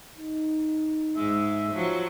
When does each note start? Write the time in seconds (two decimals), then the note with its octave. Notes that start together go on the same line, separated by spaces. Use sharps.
0.17 D#4
1.17 G#2 G#3 E5
1.72 F3 F#3